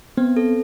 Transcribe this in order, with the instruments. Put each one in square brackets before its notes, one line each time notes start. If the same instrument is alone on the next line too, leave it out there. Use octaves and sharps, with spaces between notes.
[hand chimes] B3 [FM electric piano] C4
[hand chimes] A4